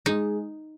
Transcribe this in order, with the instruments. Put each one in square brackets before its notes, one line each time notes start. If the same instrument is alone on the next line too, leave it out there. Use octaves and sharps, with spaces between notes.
[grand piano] G#3 [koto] D#4